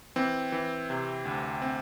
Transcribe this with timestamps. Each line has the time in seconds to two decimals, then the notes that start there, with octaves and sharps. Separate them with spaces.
0.16 E3 C4
0.52 E3
0.90 C3
1.25 D2
1.62 C4